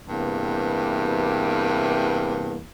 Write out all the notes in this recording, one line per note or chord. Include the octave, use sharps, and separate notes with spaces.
E2 G2 C3 A#3